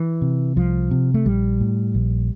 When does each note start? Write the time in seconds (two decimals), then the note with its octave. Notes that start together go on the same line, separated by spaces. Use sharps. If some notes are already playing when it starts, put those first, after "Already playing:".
Already playing: E3
0.22 C3
0.56 C2 F3
0.91 C3
1.14 A3
1.25 A#1 G3
1.60 A2
1.94 A#1